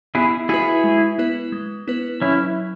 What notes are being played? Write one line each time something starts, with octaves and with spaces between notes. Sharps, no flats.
B3 E4 G#4
E4 F#4 G#4 B4
G#3
B3 E4 B4
G#3
B3 E4 B4
F#3 C#4 E4